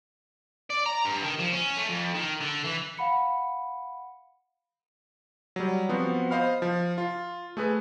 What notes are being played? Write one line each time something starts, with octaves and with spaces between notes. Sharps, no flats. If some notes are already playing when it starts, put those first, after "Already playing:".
D5
A#5
G2
D#3
F3
C#4
A3
F2
D#3
D3
E3
F5 F#5 B5 C#7
F#3 G3
F3 B3 C4 F#4
C5 D#5 F5 B5 F6
F3
F4
A3 G#4 B4